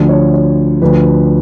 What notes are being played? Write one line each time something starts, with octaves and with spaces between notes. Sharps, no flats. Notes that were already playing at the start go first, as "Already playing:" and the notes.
Already playing: D2 D3 F3
C#5
C#5
D2 D3 F3 B4